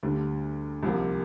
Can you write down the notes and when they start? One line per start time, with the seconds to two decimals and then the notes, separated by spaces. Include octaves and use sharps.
0.03 D2 D3 G3
0.83 C2 C3 F3 A#3